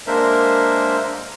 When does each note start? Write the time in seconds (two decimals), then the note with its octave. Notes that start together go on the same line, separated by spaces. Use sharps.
0.07 G#3 A#3 D4 A#4 C5 E5